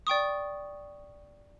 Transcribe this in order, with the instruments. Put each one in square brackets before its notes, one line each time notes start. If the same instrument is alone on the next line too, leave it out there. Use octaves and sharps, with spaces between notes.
[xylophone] D5 G5 C#6 D#6